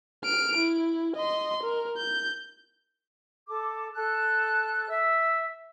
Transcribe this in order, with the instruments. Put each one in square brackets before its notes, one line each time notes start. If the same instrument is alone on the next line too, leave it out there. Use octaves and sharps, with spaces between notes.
[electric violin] F6 D7
E4
D#5 C6
A#4
G6
[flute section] A4 D6
A4 F#6
E5 E6